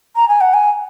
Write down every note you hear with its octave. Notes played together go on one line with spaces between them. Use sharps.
A#5
G#5
F#5
G#5